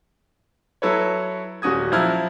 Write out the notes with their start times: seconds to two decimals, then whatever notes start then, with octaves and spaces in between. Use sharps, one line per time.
0.82 F#3 E4 A4 B4 C#5
1.62 D#1 C#4 F#4 D#6 G#6
1.92 F3 F#3 E4 F6 G#6